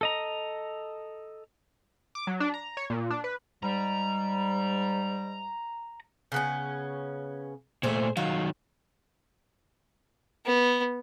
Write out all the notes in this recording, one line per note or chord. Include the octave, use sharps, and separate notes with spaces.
A4 D#5 A#5
D6
F#3
D4
A#5
C#5
A#2
D4
B4
G#2 G3 A#5
C#3 B3 C#4
A#2 A3 G#4 C5
D#3 F#3 F4
B3